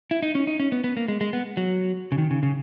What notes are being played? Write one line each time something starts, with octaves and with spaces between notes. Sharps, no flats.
E4
D#4
C#4
D#4
C#4
B3
B3
A#3
G#3
G#3
B3
F#3
C#3
D#3
C#3
C#3